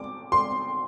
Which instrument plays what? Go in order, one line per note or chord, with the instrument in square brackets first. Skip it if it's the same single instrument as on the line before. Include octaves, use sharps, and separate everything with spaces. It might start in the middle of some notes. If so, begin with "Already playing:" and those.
Already playing: [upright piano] D6
C6